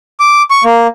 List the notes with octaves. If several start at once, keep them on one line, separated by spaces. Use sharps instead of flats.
D6
C#6
A#3